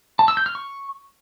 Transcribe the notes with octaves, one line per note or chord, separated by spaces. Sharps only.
A5
E6
G6
F6
C#6